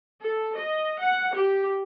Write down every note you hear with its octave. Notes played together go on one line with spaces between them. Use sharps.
A4
D#5
F#5
G4